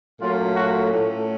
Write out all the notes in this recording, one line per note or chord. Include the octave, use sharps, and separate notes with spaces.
A#2 F#3 A3 C#4 F4
F#4
A2 A3 C#4